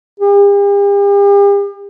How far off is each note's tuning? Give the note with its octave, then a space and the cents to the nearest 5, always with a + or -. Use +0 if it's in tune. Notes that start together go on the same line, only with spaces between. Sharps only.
G4 +45